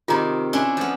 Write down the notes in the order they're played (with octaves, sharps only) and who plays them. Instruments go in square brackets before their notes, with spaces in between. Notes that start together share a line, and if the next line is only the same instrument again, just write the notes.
[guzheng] C3 D#3 [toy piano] F4 G#4 A#5
[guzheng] C#4 D4 E4
F3 B3